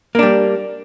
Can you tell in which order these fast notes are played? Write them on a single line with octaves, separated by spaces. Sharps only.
A#3 D4 G3